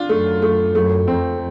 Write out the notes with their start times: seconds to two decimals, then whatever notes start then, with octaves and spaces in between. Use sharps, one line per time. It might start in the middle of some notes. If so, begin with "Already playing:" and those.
Already playing: D4 F4
0.09 F#2 A3
0.42 A3
0.74 F#2 A3
1.07 F2 C4